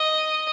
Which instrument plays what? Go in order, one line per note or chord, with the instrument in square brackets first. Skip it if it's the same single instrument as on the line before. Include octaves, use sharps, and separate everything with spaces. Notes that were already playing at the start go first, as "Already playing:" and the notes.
Already playing: [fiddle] D#5